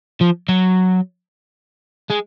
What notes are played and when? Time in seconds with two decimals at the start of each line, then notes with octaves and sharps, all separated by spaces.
0.21 F3
0.49 F#3
2.10 G#3